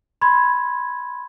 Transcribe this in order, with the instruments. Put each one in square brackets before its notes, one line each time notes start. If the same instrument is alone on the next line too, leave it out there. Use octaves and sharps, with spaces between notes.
[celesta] B5 C6 G#6